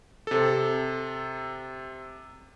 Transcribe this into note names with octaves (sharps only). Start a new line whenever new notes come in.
C3 A4